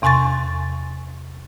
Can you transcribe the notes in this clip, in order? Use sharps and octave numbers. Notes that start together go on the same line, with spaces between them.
E2 C3 G#5 C6 C#6 A6